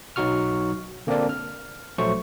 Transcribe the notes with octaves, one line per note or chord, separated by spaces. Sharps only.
B1 F#3 D#4 F#4 C#6 F6
D3 A#3 C4 D4 A#4 D5
F6
A#1 F#3 A3 C5 C#6